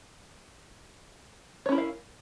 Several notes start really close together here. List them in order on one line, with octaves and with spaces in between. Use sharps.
C#5 C#4 E4 A#4 F5